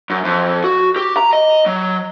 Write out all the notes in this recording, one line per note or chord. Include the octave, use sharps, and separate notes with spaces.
F#2
F2
F#4
G4
A#5
D#5
F#3